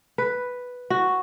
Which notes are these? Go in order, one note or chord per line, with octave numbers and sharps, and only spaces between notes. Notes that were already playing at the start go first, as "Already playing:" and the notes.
B4
F#4